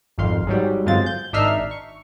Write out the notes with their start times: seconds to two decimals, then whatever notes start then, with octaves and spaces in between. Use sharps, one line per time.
0.18 G#1 F2 F5 C6
0.47 G#2 F#3 G3
0.85 G1 F#3 G#3 C4 F4 A6
1.06 G6
1.33 G#1 D4 D#4 E5 F6 C7
1.71 C#6